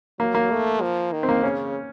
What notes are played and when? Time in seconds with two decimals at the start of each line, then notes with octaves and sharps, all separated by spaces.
0.19 F#3 A#3
0.34 A#3
0.51 A3
0.82 F3
1.12 D#3
1.23 C4
1.29 A#3
1.43 C#3 C#4